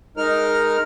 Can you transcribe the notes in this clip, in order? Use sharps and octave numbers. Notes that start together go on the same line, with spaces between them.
G#3 D#4 A#4 F6